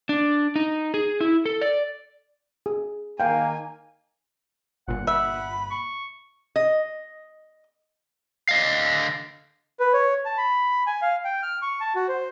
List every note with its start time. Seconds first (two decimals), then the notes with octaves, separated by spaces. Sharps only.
0.09 D4
0.56 D#4
0.94 G#4
1.21 E4
1.46 A4
1.61 D5
2.66 G#4
3.20 D#3 A#3 F5 G5 G#5
4.88 G1 A#2 F#5
5.07 E5 F#5 B5
5.71 C#6
6.56 D#5
8.49 D3 D#5 F5
9.80 B4
9.93 C#5
10.25 A5
10.37 B5
10.87 G#5
11.02 F5
11.25 G5
11.43 F6
11.62 C#6
11.80 A5
11.96 F#4
12.08 C5